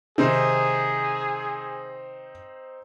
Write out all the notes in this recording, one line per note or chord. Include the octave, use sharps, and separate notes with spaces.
C3 D#3 C4 D#4 G#4 C5